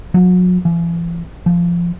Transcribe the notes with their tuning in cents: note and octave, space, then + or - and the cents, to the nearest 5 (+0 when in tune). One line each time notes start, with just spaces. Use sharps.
F#3 -35
E3 +45
F3 -15